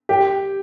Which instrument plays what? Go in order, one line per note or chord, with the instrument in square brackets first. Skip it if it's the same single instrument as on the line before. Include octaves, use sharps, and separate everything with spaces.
[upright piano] G4